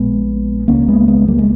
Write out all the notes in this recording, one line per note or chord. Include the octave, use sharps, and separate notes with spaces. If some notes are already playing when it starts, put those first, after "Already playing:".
Already playing: A#1 A#2 G#3 B3
C#2 C#3 A#3 C#4
G#3 B3
G#3 B3
G3 A#3
G#3